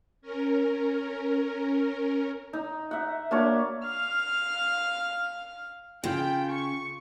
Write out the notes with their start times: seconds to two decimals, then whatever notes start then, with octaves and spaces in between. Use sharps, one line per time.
0.22 C#4 A#4
2.53 D#4
2.91 E5 F#5
3.31 A#3 D4 F#4 C#5
3.85 F5 F6
6.04 C#3 F4 G5 B5
6.52 C#6